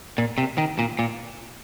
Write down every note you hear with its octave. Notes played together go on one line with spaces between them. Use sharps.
A#2
C3
D#3
A#2
A#2